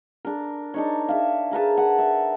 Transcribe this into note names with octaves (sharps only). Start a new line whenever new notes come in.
D4 A#4
D4 D#4 C#5
E5 F5
G#4 A#4 B4 A5
F#5
E5